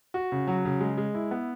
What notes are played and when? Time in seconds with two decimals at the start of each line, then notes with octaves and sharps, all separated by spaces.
0.14 F#4
0.32 C#3
0.47 F#3
0.65 C#3
0.81 G#3
0.98 G#3
1.15 E4
1.31 B3